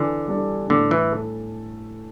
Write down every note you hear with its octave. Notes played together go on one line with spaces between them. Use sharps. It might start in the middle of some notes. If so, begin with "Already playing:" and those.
Already playing: D3 E3
G3 D4 A4
A2 D3
E3
A4